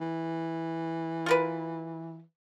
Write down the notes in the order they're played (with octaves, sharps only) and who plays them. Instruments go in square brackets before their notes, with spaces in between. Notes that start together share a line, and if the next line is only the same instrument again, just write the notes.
[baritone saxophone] E3
[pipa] F4 A#4 B4